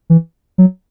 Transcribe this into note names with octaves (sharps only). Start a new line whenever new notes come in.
E3
F#3